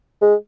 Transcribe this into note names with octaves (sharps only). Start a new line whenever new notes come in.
G#3